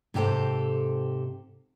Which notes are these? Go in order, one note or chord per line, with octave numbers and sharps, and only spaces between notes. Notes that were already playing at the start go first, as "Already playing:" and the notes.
G#2 C3 G4 A4 C5